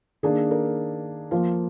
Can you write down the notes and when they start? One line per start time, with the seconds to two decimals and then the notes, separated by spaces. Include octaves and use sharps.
0.23 D#3 A#3 D4 G#4
0.51 A#4
1.31 F3 A#3 F4